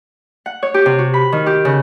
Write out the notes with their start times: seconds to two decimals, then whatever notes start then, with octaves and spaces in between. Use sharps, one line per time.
0.46 F#5
0.63 C#5
0.74 G4
0.86 C3
0.99 F#4
1.14 B5
1.32 D#3
1.46 G4
1.65 C#3